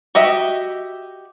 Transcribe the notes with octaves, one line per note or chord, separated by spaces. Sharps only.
F#4 G4 D#5 E5